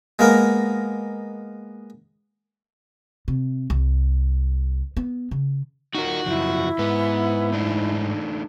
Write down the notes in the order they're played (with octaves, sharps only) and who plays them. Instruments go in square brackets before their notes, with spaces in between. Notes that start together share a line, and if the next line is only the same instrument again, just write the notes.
[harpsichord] G#3 A#3 B3 A#4
[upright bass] C3
C2
B3
C#3
[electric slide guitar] D#4 F4 A#4 [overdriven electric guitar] F#4
[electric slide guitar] F#2 C#3 F3 [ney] E4
[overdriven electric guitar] G#2 [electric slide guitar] B3 B4
[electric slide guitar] A3 D4 D#4